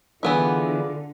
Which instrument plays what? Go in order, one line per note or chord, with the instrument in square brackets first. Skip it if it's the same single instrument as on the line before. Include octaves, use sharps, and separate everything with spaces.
[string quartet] D3 [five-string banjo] E3 B3 E4 [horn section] F4 G#4 D5